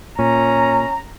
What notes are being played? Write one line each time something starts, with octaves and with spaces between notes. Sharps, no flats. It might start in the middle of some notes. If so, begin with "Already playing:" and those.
A#2 C#4 A#5